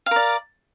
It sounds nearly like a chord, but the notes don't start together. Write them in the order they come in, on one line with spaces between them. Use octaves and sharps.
F5 A#4 D5